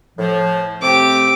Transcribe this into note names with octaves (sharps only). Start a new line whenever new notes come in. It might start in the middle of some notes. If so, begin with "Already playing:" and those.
A2 F3
C3 A3 C4 G4 D6